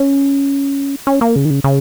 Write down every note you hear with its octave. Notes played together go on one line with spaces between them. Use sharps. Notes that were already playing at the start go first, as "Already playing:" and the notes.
Already playing: C#4
C#4
A#3
C#3
D#3
C#3
C#3